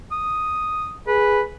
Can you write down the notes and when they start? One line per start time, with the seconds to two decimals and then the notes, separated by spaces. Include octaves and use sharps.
0.12 D#6
1.07 G#4 B4